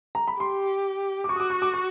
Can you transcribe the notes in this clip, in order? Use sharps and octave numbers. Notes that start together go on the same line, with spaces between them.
A#5
B5
G4 C6
D6
F#4 C#6
D#6
D6
C#6
D6
C#6